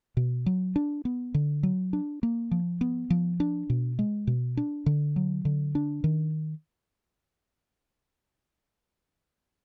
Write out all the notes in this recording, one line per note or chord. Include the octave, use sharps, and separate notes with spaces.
B2
F#3
D4
B3
D3
F#3
D4
A#3
F3
B3
F3
D4
B2
G#3
B2
D4
D3
F#3
D3
D4
D#3